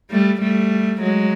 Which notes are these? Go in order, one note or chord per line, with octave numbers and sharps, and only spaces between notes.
G3 A3
G3 A3
F#3 G#3